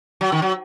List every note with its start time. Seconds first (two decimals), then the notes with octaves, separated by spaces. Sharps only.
0.21 F#3
0.32 D#3
0.42 F#3